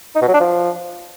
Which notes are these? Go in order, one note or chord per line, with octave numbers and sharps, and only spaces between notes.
D#4
B2
F#3
D4
F3